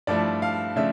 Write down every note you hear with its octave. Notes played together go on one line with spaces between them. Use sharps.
G2 F3 A3 E4 D5
F5
C#3 F3 A3 D4 E5